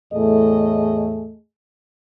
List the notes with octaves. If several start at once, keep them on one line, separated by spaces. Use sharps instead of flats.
E2 A2 A3 G#4 D#5